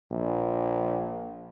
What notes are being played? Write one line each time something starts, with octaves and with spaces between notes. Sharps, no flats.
A#1